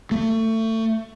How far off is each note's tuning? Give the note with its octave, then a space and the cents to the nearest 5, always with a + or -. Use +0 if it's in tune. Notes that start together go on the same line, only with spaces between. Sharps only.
A3 +25